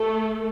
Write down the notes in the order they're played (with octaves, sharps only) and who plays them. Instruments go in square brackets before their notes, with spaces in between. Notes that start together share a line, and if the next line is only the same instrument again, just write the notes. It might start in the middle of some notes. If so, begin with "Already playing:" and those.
Already playing: [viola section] A3 A4